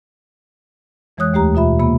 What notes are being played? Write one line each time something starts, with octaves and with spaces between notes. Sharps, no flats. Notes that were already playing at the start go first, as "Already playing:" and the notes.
F2 E3 G#3 C#5 D#6 F#6
D#2 A3 G4 A#5
B2 F4 E5 B5
C3 A#3 B5